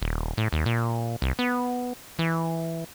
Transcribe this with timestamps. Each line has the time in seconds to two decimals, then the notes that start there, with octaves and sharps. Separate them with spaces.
0.02 D#1
0.37 A2
0.53 D#2
0.66 A#2
1.22 C2
1.39 B3
2.19 E3